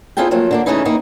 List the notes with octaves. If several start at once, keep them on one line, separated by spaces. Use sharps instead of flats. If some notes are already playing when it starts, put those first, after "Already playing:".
C4 E4 F4 G#4 A4 G5
F3 F#3 A3 A#3
D3 A#3 D4
C#3 E3 A3 C#4 D#4 E4
D#3 A#3 D#4 E4